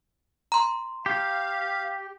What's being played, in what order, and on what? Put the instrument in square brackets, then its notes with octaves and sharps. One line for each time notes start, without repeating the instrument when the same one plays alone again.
[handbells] A#5 C6
[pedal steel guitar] G4 [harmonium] F5